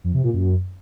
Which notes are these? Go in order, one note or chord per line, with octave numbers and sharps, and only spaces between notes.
F2
C3
A#2
F#2